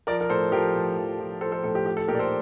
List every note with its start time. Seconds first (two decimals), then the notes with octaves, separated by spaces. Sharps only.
0.07 F3 A#4 D5
0.21 A#4
0.30 A2 A4 C5
0.52 F3 G4 A#4
0.75 A2
0.97 F3
1.20 F3
1.41 F3 A4 C5
1.52 A4 C5
1.64 A2 A4
1.75 G4
1.86 F3 G4
1.97 A4
2.08 A#2 G4 A#4
2.15 D5
2.19 A4 C5